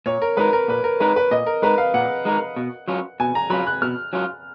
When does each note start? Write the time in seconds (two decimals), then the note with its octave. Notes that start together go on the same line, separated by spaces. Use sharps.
0.06 A#2 C#5
0.22 A#4
0.37 G#3 D#4 A#4 B4
0.53 A#4
0.68 A#2 B4
0.84 A#4
1.00 G#3 D#4 A#4 B4
1.16 B4
1.31 A#2 D#5
1.46 A#4
1.62 G#3 D#4 A#4 B4
1.78 F5
1.94 A#2 F#5
2.25 G#3 D#4 A#4
2.56 B2
2.88 F#3 C#4 F4
3.20 B2 G#5
3.35 A#5
3.50 F#3 C#4 F4 B5
3.67 F#6
3.82 B2 F6
4.13 F#3 C#4 F4